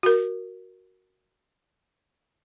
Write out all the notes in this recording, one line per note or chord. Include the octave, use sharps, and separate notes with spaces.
F#4 A#4